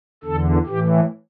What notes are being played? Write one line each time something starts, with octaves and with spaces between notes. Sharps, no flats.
E2 D3 A4
A2 E3 G4